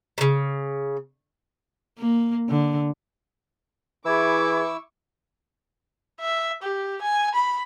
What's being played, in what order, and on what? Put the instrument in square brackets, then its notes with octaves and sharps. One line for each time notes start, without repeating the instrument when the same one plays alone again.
[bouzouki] A#2 C#3
[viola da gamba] A#3
D3
[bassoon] E3 [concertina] E4 E6 [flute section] G#4 B5 G#6 [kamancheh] C#6 D6
[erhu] E5
G4
G#5
B5